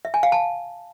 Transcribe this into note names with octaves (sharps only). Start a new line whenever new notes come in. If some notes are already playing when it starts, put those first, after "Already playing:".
E5
G#5
F5
A5